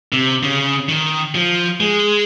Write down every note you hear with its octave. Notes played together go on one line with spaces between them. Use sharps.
C3
C#3
D#3
F3
G#3